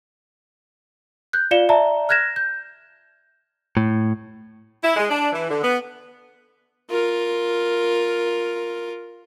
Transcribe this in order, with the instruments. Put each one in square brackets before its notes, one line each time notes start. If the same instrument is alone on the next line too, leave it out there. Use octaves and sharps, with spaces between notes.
[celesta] F#6 G6
F4 D5 F5 C#7 E7 G7
D5 E5 A5 A#5
F6 F#6 G#6 A#6 E7
G6
[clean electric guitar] A2
[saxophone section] E4
G#3
D4
E3
D3
B3
[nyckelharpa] F4 A#4